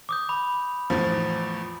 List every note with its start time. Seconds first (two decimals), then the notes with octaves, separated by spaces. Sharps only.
0.09 D6 D#6 G6
0.29 B5
0.90 E2 A2 F3